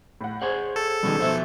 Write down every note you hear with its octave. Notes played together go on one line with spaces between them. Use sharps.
A2 F#5
G#4 C5 C#5 F#5
A4
A4
B2 D#3 G3 C#4 G#4
B2 F3 A3 C5 E5